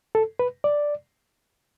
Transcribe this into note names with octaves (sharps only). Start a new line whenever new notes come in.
A4
B4
D5